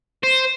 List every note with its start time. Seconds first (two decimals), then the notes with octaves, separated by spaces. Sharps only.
0.23 C5